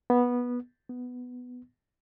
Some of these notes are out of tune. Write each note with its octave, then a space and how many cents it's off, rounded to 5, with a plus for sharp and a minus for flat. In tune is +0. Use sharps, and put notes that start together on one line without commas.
B3 -15
B3 +5